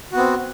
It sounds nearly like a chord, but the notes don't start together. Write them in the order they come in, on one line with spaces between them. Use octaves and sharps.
F#4 B3 C4